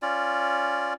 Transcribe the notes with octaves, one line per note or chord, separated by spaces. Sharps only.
C#4 F4 D5